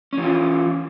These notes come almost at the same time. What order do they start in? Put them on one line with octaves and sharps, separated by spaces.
C#4 E3 F4